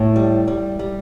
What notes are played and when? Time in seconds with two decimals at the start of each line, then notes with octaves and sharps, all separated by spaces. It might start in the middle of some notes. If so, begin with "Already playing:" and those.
Already playing: A2
0.16 G3
0.48 G3
0.79 G3